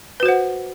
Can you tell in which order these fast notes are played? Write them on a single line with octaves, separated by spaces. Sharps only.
B4 F#4 C5 F#5